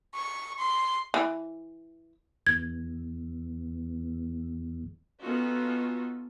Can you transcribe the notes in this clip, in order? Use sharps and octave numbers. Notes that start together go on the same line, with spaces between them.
C#6
C6
E3
E2 G#6
B3 C#4 D#4 F4 F#4 A4